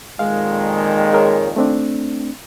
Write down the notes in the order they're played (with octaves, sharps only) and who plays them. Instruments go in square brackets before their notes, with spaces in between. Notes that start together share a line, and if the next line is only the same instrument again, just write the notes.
[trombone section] F2 A#2 D#3 [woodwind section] G#3 [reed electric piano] F5
[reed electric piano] G#4 A#4 C#5
A3 C4 D4